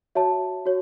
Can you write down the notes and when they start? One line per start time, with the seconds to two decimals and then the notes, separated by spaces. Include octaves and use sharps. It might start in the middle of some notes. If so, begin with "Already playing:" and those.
0.15 F#4 C#5 E5 A5
0.65 F#4 C#5